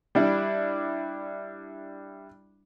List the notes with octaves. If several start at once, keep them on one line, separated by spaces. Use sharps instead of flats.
G3 D4 E4 D5